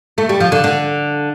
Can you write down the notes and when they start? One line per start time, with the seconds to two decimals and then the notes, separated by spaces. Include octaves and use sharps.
0.18 A3
0.29 G3
0.40 F3
0.52 D3
0.64 D3